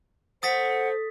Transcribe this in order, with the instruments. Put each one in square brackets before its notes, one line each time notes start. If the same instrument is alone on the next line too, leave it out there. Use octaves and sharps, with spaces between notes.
[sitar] A3 [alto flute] C5 [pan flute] F#5 [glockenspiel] D#6 A6 B6